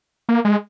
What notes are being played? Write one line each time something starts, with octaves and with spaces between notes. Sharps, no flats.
A#3
G#3